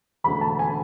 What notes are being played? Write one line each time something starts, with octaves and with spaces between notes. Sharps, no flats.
E1 D2 D3 B5
A5
G#5